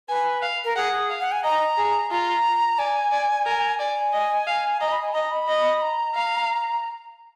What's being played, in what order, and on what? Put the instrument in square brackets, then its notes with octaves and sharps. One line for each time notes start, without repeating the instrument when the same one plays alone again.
[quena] B4 [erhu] G#5
[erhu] F5
[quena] A#4
[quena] G#4 [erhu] F#5
[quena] G#4
[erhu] F5
[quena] F#5
G#5
[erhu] D#5 [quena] A#5
[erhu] G#4
[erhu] F4 [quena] A#5
[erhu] D5 [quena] G#5
[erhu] D5
A#4
[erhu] D5 [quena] G#5
[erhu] D#5
F5
[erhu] D#5 [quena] A#5
[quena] B5
G#5
[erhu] D#5 [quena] A#5
[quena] B5
[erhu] D#5
[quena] A#5
[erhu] F5